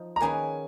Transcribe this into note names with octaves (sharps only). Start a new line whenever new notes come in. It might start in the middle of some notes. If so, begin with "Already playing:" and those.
Already playing: F3 D#4
A#5
D#3 A#3 C#4 G#4 B4 G#5